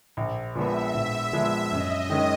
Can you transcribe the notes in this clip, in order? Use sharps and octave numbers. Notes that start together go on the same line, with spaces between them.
A#1
A#2 F3 G#3 B3 E5
A#1
A#2 F3 G#3 B3
F#2 D#5
D#3 G#3 C#4